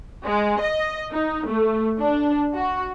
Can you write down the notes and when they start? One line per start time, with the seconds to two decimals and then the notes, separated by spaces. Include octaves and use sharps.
0.25 G#3
0.61 D#5
1.11 D#4
1.47 A3
1.99 D4
2.55 F#4